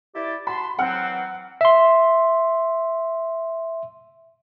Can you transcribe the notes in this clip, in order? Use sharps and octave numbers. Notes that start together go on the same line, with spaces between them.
E4 G4 D5
F#4 A5 B5 C6
E3 F#3 C4 F#5 F6 F#6
E5 C6